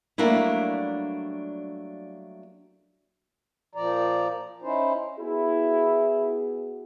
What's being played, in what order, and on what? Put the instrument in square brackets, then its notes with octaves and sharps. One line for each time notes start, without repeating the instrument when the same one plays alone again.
[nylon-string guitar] F#3 G3 A3 A#3 D4 E4
[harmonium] A#2 F3 D5 A#5
C#4 D#4 E4 C5
[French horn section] B3 F#4 G#4 [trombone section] E4